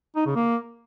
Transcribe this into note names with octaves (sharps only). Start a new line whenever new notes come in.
D#4
C#3
A#3